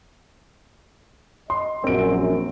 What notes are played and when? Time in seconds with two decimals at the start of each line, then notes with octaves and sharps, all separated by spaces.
1.50 D#5 C6
1.84 A#1 F#2 C4 D7